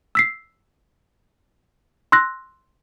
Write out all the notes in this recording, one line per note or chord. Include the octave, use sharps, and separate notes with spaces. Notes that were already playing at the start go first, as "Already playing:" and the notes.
E6 B6 C7
C6 E6 F#6 A#6